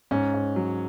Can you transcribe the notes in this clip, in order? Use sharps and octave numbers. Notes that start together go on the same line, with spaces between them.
G#2 C#4
G#2
F#3